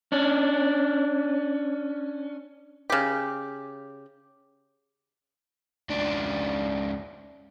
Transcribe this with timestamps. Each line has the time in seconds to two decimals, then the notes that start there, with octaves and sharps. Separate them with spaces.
0.12 C#4 D4
2.90 C#3 G4
5.89 C#2 D4